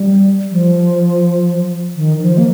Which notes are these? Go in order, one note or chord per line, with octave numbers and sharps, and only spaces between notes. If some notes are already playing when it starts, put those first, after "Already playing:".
Already playing: G3
F3
D#3
F3
A#3